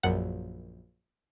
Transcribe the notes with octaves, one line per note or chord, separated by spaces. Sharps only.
A#1 F#2 F#5